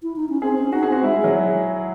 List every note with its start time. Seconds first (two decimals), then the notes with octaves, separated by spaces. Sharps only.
0.03 E4
0.16 D#4
0.29 C#4
0.42 C4 G#4
0.58 C#4
0.73 D#4 F#4
0.83 G#4
0.88 C4 F#4
1.04 G#3 E4
1.20 F#3 G#3